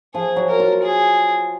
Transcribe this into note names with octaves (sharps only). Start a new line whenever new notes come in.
F3 G#4
F#3
A#4
F4
G#4